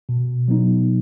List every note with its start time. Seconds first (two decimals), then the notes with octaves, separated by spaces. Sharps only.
0.09 B2
0.48 F#3 B3 D#4